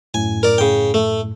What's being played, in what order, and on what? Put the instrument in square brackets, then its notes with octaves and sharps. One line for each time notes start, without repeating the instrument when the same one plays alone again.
[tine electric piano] F#2 A2 [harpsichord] G#5
[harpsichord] A#4 D5
C#3 G5
A3